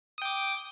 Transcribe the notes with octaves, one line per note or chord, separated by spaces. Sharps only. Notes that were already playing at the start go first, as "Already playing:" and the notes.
G5 D6 D#6